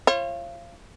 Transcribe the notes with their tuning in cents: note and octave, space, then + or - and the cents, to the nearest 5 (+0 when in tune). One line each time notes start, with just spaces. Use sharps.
F4 -30 C#5 -45